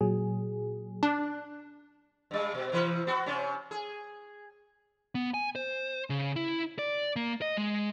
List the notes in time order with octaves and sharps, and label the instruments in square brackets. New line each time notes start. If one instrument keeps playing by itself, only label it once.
[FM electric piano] A#2 F#3 G#4
[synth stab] D4 [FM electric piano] F#6
[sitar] G2 G3
B2
C3 E3 B4
B3 F#4
C3 C#4
G#4
[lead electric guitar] B3
G#5
C5
C#3
E4
D5
A#3
D#5
G#3